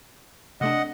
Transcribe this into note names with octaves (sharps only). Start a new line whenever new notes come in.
C3 A3 D4 D#5 F#5